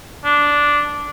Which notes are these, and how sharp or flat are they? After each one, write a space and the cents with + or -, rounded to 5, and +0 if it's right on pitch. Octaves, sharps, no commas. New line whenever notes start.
D4 -5